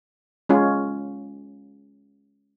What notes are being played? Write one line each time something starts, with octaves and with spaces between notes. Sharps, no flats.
G#3 C#4 F4